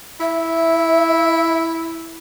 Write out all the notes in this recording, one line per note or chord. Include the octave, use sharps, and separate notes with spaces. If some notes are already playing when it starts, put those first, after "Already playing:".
E4 E5